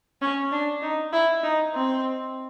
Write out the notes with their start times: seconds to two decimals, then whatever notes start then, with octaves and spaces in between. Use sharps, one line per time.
0.21 C#4
0.52 D4
0.82 D#4
1.13 E4
1.43 D#4
1.74 C4